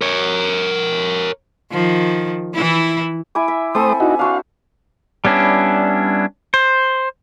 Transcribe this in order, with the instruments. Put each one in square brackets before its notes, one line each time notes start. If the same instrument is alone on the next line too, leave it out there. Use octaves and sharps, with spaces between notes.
[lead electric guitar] A#4 C#5
[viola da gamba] D#3 F3
E3 E4
[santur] E4 G#5 D6
E5
[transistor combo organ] A3 C5 D#6 [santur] C4 A4 [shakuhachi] G#5
[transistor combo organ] D#4 E4 F#4
[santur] D4 F#4 C5 [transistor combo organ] F5
[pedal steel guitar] G3 B3 C#4 D4 E4
C5